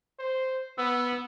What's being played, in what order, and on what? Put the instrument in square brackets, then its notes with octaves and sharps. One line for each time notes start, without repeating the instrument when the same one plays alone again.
[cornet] C5
[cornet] B3 [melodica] E6